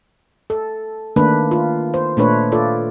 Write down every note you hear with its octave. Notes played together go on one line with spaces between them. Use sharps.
A4
D#3 A3 A#3 D4 B4
F4
C5
A#2 A3 D4 B4 C#5
F4 A4 D5